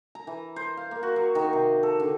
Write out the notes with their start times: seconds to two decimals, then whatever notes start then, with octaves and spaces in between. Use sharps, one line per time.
0.15 A#5
0.27 E3
0.56 C5
0.77 F5
0.91 A#3
1.03 F#4
1.16 F#3
1.35 D#3
1.53 C3
1.83 A4
2.00 D3